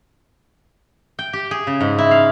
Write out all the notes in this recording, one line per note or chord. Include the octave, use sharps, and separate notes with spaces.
G5
G4
G#4
C#3
G#2
E4
F5